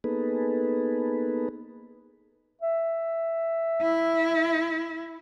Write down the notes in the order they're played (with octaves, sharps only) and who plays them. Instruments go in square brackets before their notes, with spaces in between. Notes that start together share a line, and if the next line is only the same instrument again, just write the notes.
[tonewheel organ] A#3 B3 D#4 G#4 A4 B4
[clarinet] E5
[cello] E4